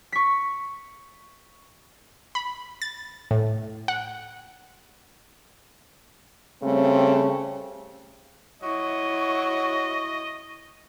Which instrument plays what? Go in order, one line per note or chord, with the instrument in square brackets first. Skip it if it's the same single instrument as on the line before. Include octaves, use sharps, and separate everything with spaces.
[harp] C#6 B6
[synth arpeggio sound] B5
A6
A2
F#5
[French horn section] C#3 G3 A3 C4
[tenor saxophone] F#3 [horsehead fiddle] E4 [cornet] D#5 [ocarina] C#6